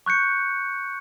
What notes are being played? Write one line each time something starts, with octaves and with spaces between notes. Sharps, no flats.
C#6 F#6 G6 C#7